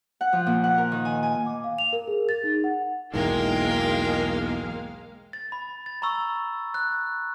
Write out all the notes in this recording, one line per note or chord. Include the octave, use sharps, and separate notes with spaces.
F#5
F3
A#2
F#5
A#4
D#3
G#5
G#5
D6
F5
F7
A#4
G#4
A6
D#4
F#5
B1 E2 G#2 G#3 A#3 A#4 F5 G5
A6
B5
A6
A#5 B5 C#6 E6
F#6